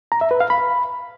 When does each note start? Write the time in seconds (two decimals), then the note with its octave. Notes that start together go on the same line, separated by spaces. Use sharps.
0.12 A#5
0.21 E5
0.31 B4
0.40 F5
0.50 B5